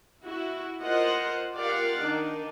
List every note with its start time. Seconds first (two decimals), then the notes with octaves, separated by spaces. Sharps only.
0.24 E4 F#4
0.82 F4 A#4 C5 D#5 F#5
1.55 F4 G4 A#4 D5 F5 F#5
2.01 D#3 D4 D#4